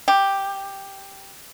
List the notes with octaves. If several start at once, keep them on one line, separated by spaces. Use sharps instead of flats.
G4